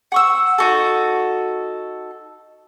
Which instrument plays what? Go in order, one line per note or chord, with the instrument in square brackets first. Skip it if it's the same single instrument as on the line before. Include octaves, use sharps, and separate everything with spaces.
[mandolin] F#5 C#6 E6
D#4 F#4 A4